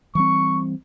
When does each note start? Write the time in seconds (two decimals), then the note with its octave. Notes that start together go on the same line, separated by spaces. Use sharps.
0.15 E3 G3 C4 C#6